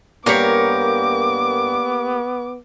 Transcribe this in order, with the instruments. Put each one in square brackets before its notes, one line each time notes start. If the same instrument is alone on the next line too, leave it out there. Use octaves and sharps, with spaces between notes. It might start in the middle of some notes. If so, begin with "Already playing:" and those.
[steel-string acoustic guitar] G2 A#4 [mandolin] A#3 G4 C#5 [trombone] B3 [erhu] D6